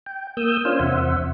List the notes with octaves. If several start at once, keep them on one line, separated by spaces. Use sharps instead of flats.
G5
A#3 D#6 E6 G6
C#4 D4 F4 C5 F5 G#5
E2 C3 C5 E5 F#5